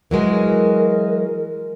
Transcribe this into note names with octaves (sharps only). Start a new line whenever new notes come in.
E3 F#3 G#3 A#4